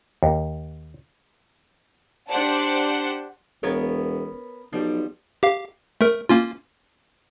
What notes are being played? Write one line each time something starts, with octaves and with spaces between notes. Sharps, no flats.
D#2
D4 G4 C5 D5 F#5 A5
E1 B3 A#4 C#5
B1 F3 G3 G4
G4 F5
A3 A#4
A#3 C#4 F4